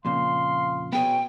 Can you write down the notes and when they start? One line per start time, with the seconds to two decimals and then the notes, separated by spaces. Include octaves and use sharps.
0.05 F2 A#2 C#3 F5 C6
0.93 B2 B3 G#4 C#5 G5